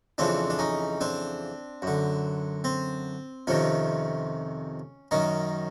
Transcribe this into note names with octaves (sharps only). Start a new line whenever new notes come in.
F2 C#3 E3 C4 D4
D4
C#4 D#4
C4 D4
F#2 D3
C4
F2 C3 D#3 C#4
F#2 D#3 C#4 D#4